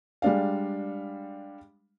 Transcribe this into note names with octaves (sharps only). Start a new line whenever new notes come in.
G3 G#3 D4 F5